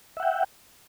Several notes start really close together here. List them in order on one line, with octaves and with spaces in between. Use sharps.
E5 F#5 G5